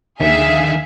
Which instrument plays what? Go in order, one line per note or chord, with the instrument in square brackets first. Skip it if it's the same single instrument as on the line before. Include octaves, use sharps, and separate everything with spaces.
[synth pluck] D#2 [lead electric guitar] D3 D#3 [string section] G#4 E5 F5